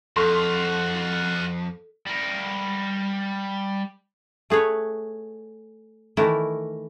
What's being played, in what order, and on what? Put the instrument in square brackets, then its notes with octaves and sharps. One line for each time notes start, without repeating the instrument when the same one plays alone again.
[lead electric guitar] F2 [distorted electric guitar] F#4 F5 [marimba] A4 [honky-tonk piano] C6 C#6 B6
[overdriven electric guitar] G3 A#4
[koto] A3 G#4 B4 C#5
D#3 E3 A3 E4 A#4